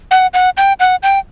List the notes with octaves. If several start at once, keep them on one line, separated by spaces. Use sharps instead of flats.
F#5
F#5
G5
F#5
G5